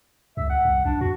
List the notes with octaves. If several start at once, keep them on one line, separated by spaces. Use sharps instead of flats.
C#2 E5
F#5
C2
B1 D4
E2 F#4